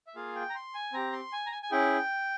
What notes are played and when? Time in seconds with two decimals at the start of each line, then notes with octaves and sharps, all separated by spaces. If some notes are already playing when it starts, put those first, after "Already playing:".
0.07 E5
0.15 A#3 F4 G#4 F5
0.35 G5
0.50 A#5
0.55 C6
0.74 G#5
0.93 C4 G4 A#5
1.12 C6
1.33 G#5
1.46 A#5
1.52 G#5
1.63 G#5
1.71 C#4 E4 G#4 G5